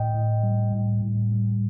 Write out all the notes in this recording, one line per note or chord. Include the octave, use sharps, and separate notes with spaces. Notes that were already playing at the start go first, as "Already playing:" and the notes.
Already playing: A2 D#5 G5
A2
G3
A2
A2
G3